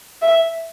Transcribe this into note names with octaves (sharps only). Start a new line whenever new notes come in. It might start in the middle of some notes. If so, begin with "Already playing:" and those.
E5